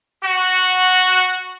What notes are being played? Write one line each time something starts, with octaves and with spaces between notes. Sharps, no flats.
F#4